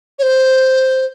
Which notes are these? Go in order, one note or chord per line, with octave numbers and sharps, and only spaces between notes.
C#5
C5